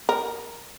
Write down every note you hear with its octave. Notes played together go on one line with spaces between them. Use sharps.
A#4